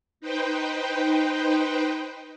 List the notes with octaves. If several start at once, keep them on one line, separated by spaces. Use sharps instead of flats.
D#4 B4 C5 G5